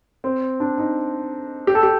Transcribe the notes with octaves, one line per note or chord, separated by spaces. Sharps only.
C4
D4
D#4
G4
A4
G4